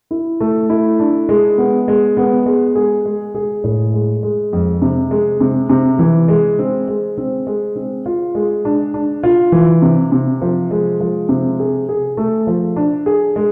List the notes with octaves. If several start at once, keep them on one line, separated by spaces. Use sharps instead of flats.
E4
A3
E4
D4
G#3
B3
G#3
B3
G#3
G#4
G#3
G#4
A2
G#3
G#3
F2
C3
G#3
C3
C3
E3
G#3
C4
G#3
C4
G#3
C4
F4
G#3
D4
D4
F4
E3
C3
C3
F3
G#3
F3
C3
G#4
G#4
A3
F3
D4
G#4
G#3